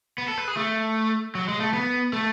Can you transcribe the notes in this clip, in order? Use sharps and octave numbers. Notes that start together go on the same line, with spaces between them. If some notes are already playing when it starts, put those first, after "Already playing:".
B3
A4
B4
G#4
A3
F#3
G#3
A3
B3
A3